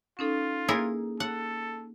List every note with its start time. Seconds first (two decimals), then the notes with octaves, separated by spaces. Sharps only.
0.19 C#4 D#4 F4 A4
0.69 A#3 E4 G#4 A#4
1.20 A4 F#5